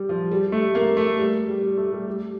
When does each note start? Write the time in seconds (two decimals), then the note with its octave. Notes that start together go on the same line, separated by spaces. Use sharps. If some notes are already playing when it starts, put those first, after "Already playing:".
Already playing: G3
0.09 F3
0.31 G3
0.52 A3
0.75 A#3
0.97 A3
1.19 G3
1.48 G3
1.63 G3
1.77 A3
1.93 G3
2.07 G3